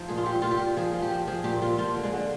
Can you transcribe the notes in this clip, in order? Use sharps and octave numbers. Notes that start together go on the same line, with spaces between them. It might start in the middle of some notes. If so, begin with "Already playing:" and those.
Already playing: F3 D#4
A#2 G#4
F4
A#2 G4
A#2 F4
G4
A#2
F3 G#4
F3
G4
F3
F3 G#4
A#2 G4
A#2 F4
F3 F4
D3
G#3
D3